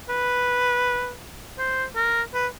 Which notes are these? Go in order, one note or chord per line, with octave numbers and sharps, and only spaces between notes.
B4
C5
A#4
B4